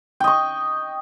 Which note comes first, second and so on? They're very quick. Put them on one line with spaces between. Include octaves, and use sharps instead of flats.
G5 D#5 C#6